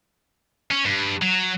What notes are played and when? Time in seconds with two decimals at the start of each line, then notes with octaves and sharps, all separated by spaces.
0.71 C#4
0.86 G2
1.22 F#3